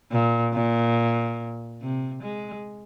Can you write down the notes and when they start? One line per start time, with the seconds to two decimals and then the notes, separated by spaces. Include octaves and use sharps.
0.11 A#2
0.54 A#2
1.81 C3
2.23 G#3